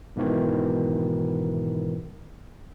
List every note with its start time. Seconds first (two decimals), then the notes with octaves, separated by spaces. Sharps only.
0.16 B1 G#2 B2 D#3 E3